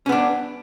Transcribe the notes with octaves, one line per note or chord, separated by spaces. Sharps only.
B3 C#4 D4